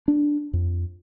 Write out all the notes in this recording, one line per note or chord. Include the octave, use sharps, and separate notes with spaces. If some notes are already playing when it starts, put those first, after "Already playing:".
D4
F2